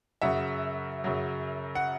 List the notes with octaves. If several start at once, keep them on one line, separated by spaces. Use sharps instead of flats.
F#2 C#3 F#3 E5 F#5
F#2 C#3 F#3
F#5